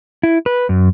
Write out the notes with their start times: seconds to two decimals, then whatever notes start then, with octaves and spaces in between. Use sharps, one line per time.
0.23 E4
0.46 B4
0.69 F#2